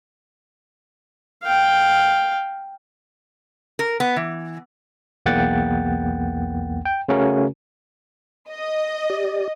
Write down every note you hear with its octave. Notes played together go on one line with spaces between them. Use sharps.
F5 G5
A#4
B3
E3
B1 E2 A#3 F#5 G5 A6
G5
C#3 A3 C#4 F#4 A#4
D#5
G4 D5